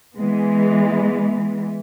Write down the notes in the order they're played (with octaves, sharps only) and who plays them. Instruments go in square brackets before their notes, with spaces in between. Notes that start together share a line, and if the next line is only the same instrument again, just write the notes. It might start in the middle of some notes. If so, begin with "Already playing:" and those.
[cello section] E3 G#3 B3